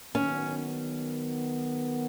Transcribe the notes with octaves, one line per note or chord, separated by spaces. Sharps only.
D#3 F#3 B3 C#4